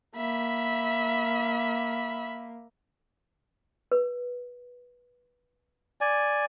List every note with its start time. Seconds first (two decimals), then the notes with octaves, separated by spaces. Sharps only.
0.17 A#3 E5 B5
3.92 B4
6.01 D5 G#5